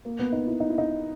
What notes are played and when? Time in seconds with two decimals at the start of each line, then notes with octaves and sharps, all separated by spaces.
0.05 A#3
0.19 B3
0.32 D#4
0.47 E4
0.60 D#4
0.70 E4
0.78 D#4